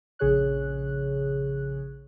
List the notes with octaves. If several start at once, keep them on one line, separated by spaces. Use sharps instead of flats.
A#1 C#3 G#4 C#5 F#6